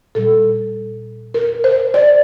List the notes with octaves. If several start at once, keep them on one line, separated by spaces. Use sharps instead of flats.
A#2 G3 A4
A#4
C5
D5